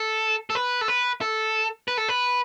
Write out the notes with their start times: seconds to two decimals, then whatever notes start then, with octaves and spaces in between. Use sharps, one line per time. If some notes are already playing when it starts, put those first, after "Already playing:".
Already playing: A4
0.50 A4
0.55 B4
0.81 A4
0.88 B4
1.21 A4
1.88 B4
1.98 A4
2.09 B4